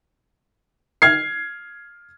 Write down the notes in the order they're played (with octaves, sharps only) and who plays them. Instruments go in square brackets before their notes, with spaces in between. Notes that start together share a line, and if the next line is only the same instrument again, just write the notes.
[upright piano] F6 G#6 C7